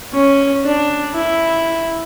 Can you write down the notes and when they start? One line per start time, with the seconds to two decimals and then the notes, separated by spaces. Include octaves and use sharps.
0.13 C#4
0.64 D4
1.14 E4